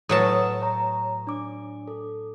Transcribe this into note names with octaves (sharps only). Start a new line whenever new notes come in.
A2 F#3 B4 A5 D#6
C#5 A#5
D4 D6
A4